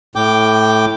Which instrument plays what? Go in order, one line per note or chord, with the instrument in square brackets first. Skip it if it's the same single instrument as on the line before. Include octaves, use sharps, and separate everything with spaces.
[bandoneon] A2 G5 D6